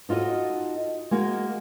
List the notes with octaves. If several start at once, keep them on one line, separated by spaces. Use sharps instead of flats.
D#4 F4 F#4 A4 D#5
G#3 A#3 F#4